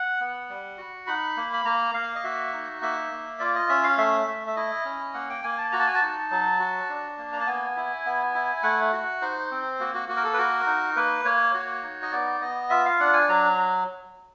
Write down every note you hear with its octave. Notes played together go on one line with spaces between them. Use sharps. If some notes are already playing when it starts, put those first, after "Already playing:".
Already playing: F#5
B3
G3
F#4
D#4 B5
A#3
B5
A#3 A#5
A#3 F5
D#5
F#4 E5
D#4
A#3 E5
A#3
F4 D5
D#5
C#4 E5
F5
A3 E5
A3
E5
E4 D#5
C#4
A#3 F#5
G5
A#3 G#5
A5
F#4 A#5
A5
G#5
A5
D#4
F#3
F#4
D4
A#3
A#5
A5
B3 G#5
E4
B3
E4
A3 F#5
F#4
D#4 C5
C4
A#3 F#4
F#4
A#3 F#4
A#4
A4
B4
F#4 A#4
D#4
A#3 B4
A#3 C#5
F#4 C#5
D#4
D#5
B3 D5
B3 D#5
F4 E5
F5
D4 F#5
G#5
F#3 A#5